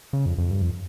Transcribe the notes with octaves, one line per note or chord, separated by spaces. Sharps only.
C#3
F2
F2
G2
F2